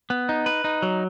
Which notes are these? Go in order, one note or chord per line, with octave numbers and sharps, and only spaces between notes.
B3
D#4
B4
D#4
F#3